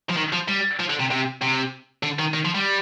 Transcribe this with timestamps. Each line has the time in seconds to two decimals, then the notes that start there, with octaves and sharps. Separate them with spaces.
0.09 F3
0.17 D#3
0.33 F3
0.48 G3
0.80 F3
0.90 D3
1.00 C3
1.11 C3
1.42 C3
2.03 D3
2.19 D#3
2.34 D#3
2.45 F3
2.55 G3